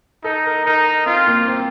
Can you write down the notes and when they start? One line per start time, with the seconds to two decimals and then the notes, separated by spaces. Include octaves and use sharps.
0.24 D#4 A4
0.45 A#4
0.65 D#4 A#4
1.06 C4 F4
1.27 A#3
1.48 C4